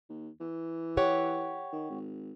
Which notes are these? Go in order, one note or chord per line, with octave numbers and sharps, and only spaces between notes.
D#2
E3
G4 C#5 F#5
D#3
G#1